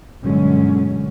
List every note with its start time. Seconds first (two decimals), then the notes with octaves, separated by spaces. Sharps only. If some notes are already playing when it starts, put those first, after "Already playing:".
0.24 G1 B2 D3 F#3 G#3 C#4